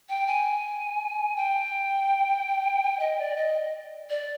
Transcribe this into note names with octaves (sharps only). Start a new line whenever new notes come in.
G5
G#5
G5
D#5
D5
D#5
D5